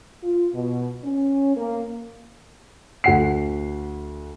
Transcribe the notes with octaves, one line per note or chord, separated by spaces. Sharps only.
F4
B2
C#4
A#3
D2 F#5 C7